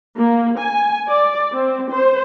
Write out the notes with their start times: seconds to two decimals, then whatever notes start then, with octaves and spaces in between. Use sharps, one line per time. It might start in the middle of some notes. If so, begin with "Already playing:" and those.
0.18 A#3
0.59 G#5
1.09 D5
1.54 C4
1.91 C5